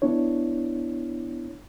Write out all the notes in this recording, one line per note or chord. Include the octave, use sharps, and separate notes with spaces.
B3 D4 E4 C#5